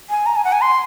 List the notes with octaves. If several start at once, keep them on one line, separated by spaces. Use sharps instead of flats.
G#5
A#5
G#5
F#5
G#5
C6